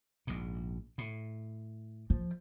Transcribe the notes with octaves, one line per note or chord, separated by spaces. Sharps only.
A#1 G#2
A2
F3